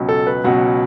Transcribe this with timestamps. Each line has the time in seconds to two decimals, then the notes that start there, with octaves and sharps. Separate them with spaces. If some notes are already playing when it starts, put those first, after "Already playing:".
Already playing: C#2 B2 F#3 C#4
0.09 A4
0.27 B4
0.44 C#2 B2 F#3 C#4 F#5